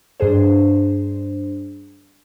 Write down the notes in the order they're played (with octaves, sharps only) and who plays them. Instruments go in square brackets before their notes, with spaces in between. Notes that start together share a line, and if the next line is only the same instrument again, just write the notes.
[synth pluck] G2 D4 G#4 C5